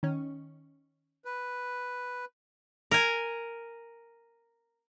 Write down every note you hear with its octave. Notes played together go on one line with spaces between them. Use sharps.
D#3 C#4
B4
A#4 G#5